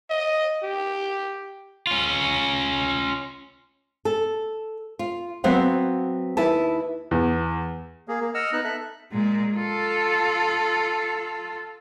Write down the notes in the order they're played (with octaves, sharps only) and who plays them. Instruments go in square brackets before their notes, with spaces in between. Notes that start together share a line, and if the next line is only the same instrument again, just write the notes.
[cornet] D#5
G4
[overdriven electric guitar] C#4 F4
[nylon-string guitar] A4
F4
F#3 B3 C4 F5 F#5
D#2 E4 B4 A5
[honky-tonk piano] E2
[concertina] A#3 G#4
A#3
D#5 F#5 E6 F6
B3 D#4 F#6
A4 E5 F#6
[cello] A#2 G#3
F4 A4